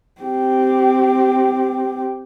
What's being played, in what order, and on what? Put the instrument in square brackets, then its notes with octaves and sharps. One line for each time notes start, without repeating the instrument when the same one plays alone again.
[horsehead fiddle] C4 G4